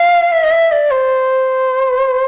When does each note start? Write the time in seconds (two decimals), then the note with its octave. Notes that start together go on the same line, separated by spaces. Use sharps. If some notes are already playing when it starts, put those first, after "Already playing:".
Already playing: F5
0.32 E5
0.43 D#5
0.51 E5
0.71 D5
0.91 C5